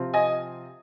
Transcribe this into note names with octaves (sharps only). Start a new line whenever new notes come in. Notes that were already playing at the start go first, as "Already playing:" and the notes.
Already playing: C3 F3 C4 F4
D#5 G#5